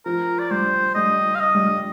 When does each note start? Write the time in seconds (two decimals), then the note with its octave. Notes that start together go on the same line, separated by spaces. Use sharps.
0.06 F3 A#4
0.39 D5
0.51 G3 C5
0.95 G3 D#5
1.35 F5
1.40 D#5
1.55 G3